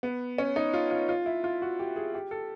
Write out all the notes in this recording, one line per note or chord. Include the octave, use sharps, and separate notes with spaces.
B3
C#4
D#4
F4
F4
F4
E4
F4
F#4
G4
G#4
G4
A4